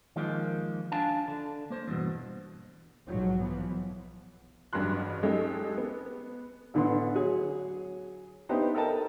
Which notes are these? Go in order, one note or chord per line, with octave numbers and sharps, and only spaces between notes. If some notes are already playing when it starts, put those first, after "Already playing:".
D#3 F3 G#3 A#3
D4 F5 G#5 A5
D3
A#3 C5
E2 G2 B2
B1 G#2 F3 F#3
E3 F3 B3
A1 G2 C#3 F#3 C6 F#6
G#3 A3 C#4 D#4 G4 A4
B3
A1 D3 B3 C6
F#3 G#4 C#5
B3 D4 D#4 G4 C5 E5
A4 A#4 D#5 G5 A5 A#5